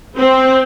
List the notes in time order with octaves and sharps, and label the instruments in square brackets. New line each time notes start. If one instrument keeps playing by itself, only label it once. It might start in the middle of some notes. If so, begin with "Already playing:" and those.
[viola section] C4